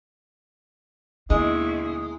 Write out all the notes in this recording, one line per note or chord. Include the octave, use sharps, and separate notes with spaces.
D#2 B2 D3 G#3 E4